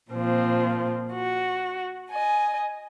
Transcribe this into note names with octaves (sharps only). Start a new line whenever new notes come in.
A#2 F3 C4
F#4
D#5 G#5